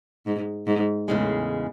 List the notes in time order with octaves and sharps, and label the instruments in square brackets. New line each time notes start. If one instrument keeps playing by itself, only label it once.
[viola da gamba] G#2
G#2
[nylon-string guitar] E2 C#3 G#3 [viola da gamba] A2